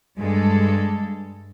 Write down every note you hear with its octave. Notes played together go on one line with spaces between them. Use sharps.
G2 G#3 A4